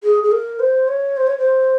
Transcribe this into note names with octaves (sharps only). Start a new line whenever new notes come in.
G#4
G#4
A#4
C5
C#5
C5
C#5
C5